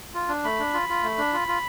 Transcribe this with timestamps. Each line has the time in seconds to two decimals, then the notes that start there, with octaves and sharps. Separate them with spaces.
0.14 F4
0.29 D4
0.44 A3 B5
0.59 D4
0.73 F4
0.89 F4
1.03 A3
1.18 D4
1.33 F4
1.48 F4